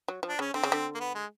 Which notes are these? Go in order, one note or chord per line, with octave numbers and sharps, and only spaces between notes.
F#3
F3
D4
C#3 C#4
D3 C4
C#3
D3
A#3
B3
G#3